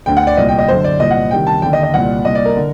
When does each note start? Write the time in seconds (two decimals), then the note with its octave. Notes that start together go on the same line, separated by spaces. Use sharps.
0.06 D2 D3 G5
0.17 F#5
0.27 D5
0.37 C2 A#2 D#5
0.49 G5
0.58 D#5
0.68 F#2 D3 C5
0.84 D5
1.00 C2 A#2 D#5
1.11 F#5
1.31 C2 C3 D#3 G5
1.47 A5
1.62 D#2 D3 G5
1.73 D#5
1.83 D#5
1.94 C2 A#2 F#5
2.25 C2 A#2 D#5
2.35 D5
2.45 A#4
2.56 D3